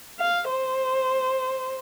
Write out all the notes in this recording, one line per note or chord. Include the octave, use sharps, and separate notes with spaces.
F5
C5